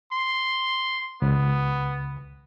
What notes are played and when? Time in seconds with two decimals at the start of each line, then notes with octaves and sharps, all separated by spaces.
0.12 C6
1.22 C#2 B3